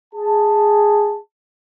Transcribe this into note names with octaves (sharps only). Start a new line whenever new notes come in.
G#4 A5